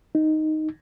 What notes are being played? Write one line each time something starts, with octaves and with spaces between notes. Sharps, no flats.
D#4